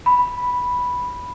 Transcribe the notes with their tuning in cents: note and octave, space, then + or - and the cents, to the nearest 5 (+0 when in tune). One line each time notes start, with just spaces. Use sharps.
B5 -5